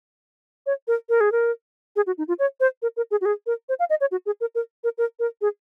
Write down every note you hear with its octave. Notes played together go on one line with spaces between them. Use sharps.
C#5
A#4
A#4
G#4
A#4
G#4
F#4
D#4
F4
C#5
C5
A#4
A#4
G#4
F#4
G#4
A#4
C5
F5
D#5
C#5
F#4
G#4
A#4
A#4
A#4
A#4
A#4
G#4